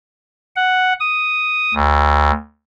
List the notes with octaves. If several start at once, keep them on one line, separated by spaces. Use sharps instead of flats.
F#5
D#6
D2